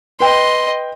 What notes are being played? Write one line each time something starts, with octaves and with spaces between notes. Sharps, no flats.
B4 D#5 G5 C6